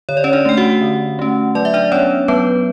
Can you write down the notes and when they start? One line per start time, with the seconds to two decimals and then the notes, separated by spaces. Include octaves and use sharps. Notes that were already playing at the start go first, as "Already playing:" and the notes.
0.09 D3 C#5
0.17 D5
0.24 C#4 C#5
0.33 D4 D5
0.45 A3 C#4 G5
0.57 F#4 F#5
0.81 D3
1.19 A3 C#4
1.55 F#3 D5
1.65 E5
1.74 D4 D5
1.92 B3 C#4 D4 C#5
2.28 F#3 B3 B4